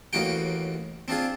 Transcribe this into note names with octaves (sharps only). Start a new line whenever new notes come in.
A1 D#2 A#3 D#4 F#4 G5
C4 D4 F4 G#4